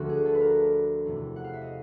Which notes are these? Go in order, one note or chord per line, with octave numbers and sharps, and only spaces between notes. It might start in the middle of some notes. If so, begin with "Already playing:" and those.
Already playing: D2 D3 F3 F#4
G#4
A4
B4
A#4
E2 C3 E3 A3 C#4
F#5
F5
E5
D#5